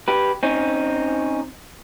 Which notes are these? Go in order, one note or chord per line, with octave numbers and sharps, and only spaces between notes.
G4 B4
C4 C#4 D#4